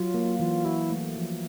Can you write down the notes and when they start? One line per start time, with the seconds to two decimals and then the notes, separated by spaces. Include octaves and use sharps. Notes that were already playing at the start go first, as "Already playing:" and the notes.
Already playing: F#3 F4
0.14 A#3
0.39 E3 F4
0.65 E4 F#4
0.90 A3
1.17 F3